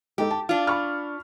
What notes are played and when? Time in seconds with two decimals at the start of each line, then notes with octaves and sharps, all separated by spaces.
0.18 G#3 D#4 G4 A4
0.31 A5
0.49 D4 F4
0.67 B5 C#6 F6